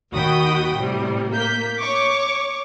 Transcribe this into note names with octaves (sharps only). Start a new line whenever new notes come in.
D#2 D#3 F#4 G5 B5 D#6
A2 C3 G3
A#3 G6 B6
C#5 C#6 D6